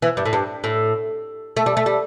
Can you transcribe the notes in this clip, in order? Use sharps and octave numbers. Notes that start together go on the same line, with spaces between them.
E3
G2
A2
G2
A2
A3
G3
A3
G3